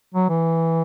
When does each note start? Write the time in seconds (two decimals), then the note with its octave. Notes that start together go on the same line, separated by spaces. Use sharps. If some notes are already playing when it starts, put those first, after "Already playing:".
0.14 F#3
0.29 E3